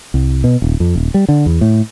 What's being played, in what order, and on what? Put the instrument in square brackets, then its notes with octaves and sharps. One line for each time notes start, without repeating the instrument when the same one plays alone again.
[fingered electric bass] C2
B2
D#1
F2
D#1
G3
D3
E2
A2